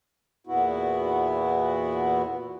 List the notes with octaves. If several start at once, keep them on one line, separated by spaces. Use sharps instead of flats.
E2 A#2 B3 E4 F#4